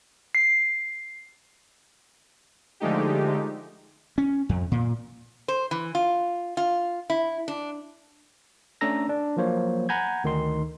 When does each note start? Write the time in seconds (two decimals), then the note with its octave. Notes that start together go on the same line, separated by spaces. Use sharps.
0.35 C7
2.80 D3 F3 G#3 A3 D#4 G4
4.18 C#4
4.49 F2
4.72 A#2
5.48 C5
5.71 E3
5.95 F4
6.57 F4
7.10 E4
7.48 D4
8.81 A3 C#4 D4 A#5 E6 A#6
9.09 D4
9.37 F3 F#3 A#3 C5 C#5
9.89 F#5 G#5 A#5 B5 G6 G#6
10.24 D2 D#3 D#4 C6